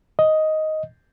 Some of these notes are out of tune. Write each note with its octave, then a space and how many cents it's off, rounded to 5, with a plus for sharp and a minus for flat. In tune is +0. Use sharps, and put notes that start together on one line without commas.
D#5 +5